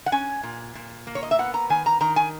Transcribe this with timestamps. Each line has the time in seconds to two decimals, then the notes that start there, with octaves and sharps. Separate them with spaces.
0.06 F#5
0.12 C#4 G#5
0.43 A#2
0.75 A#2
1.07 A#3
1.15 C#5
1.23 D#5
1.31 E5
1.39 B3 F#5
1.54 A#5
1.69 D#3 G#5
1.86 A#5
2.01 D#3 A#5
2.16 G#5